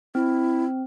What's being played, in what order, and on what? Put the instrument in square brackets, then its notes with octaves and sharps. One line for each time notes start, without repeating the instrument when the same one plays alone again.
[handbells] C4 [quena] E4